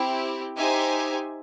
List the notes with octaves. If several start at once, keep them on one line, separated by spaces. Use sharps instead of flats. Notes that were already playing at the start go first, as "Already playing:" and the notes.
Already playing: C4 E4 G4
D#4 G4 C5 E5 G#5